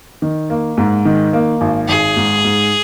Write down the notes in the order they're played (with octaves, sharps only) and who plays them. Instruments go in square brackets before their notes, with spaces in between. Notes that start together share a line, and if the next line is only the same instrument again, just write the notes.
[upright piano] D#3
A#3
G#2
D#3
A#3
G#1
[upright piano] G#1 [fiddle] G#4
[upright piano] G#2
G#2